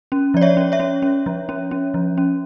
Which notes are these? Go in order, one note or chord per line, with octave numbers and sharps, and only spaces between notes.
C#4
F3 D5
C#5 E5
C#4
C#5 E5
C#4
C#4
F3
C#4
C#4
F3
C#4